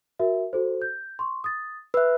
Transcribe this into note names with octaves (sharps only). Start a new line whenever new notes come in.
F#4 A#4 E5
F#4 A4 C5
G6
C6 C#6
D#6 A6
B4 E5 E6 F#6